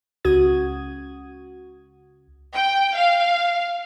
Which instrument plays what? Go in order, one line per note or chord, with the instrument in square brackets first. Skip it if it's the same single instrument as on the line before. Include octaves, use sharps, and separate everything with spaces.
[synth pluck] C#2 C#3 F#4 D#6 G#6
[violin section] G5
F5